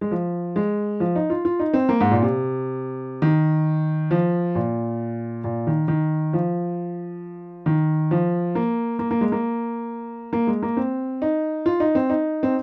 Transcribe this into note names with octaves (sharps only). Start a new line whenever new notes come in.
G#3
F3
G#3
F3
D#4
F4
F4
D#4
C4
A#3
G#2
A#2
C3
D#3
F3
A#2
A#2
D#3
D#3
F3
D#3
F3
A#3
A#3
A#3
G#3
A#3
A#3
G#3
A#3
C4
D#4
F4
D#4
C4
D#4
C4